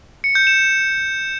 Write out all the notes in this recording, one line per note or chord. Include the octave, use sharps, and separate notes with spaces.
C#7
G6
E7